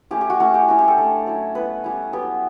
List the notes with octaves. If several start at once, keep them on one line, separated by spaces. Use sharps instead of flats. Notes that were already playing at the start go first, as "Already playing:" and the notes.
A3 C#4 E4 G4
G4
F#4
A3 C#4 E4 F#4
G4
G3 C#4 E4 F#4
G4
A4
A3 D4
F#3 C#4 E4
G3 B3 E4 B4
G3 C#4 E4
F#3 B3 E4 G4